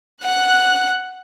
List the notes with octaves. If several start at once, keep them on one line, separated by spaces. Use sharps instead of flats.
F#5 F#6